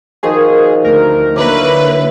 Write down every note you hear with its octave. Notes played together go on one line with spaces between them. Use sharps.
D#3 F3 F#4 G#4
D2 A#4
D3 F#3 A#3 E4 B4 D6